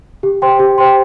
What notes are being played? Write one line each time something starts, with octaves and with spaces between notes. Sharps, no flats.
G4
C5 G5 C6
G4
C5 G5 C6